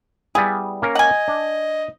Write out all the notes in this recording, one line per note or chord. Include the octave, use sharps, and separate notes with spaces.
G3 B3 E4 G#4
A#3 C#4 A#4
D#5 F#5 G#5
D4